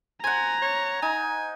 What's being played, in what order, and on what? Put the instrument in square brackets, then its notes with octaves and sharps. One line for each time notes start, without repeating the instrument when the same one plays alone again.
[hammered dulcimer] C5 F#5 [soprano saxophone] G#5 [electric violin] A#5 [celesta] G#6
[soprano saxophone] C#5
[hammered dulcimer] D#4 [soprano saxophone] G#5